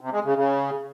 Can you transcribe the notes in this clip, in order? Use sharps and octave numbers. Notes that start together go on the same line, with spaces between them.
C3
G#3
C#3
C#3